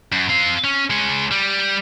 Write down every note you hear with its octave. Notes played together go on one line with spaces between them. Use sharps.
F#2
C4 F5
C#4
G#3 C#5
G3